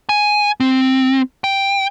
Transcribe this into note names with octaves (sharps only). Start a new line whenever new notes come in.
G#5
C4
G5